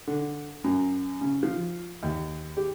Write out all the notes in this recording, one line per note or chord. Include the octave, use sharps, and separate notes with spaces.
D3
F#2
C#3
F3
D#2
G4